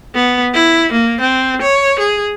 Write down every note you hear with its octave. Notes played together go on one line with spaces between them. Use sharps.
B3
E4
A#3
C4
C#5
G#4